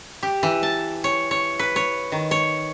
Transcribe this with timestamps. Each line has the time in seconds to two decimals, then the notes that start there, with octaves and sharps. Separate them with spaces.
0.23 G4
0.43 E3
0.63 A5
1.04 C#5
1.31 C#5
1.59 B4
1.76 C#5
2.12 D#3
2.31 C#5